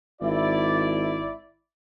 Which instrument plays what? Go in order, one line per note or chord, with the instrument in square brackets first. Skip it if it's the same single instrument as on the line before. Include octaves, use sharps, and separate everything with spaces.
[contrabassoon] G#1 [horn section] E4 D5